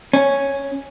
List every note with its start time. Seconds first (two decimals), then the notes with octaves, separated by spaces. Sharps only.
0.13 C#4